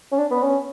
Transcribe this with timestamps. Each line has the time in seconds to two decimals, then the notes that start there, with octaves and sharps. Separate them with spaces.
0.12 C#4
0.18 D4
0.31 B3
0.43 C#4